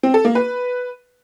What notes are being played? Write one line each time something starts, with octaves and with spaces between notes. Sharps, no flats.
C4
A4
A#3
B4